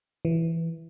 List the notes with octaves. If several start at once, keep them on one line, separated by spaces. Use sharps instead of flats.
E3